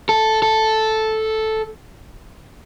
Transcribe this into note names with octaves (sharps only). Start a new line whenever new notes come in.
A4
A4